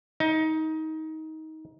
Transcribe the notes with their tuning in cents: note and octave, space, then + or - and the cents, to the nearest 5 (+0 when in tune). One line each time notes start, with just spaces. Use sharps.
D#4 +20